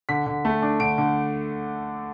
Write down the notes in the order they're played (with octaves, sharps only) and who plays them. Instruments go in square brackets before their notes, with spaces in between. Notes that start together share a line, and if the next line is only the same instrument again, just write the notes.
[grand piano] D3 B6
D3
A3
D4
D3 D7
D3